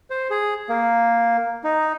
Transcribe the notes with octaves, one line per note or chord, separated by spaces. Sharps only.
C5
G#4
A#3
D#4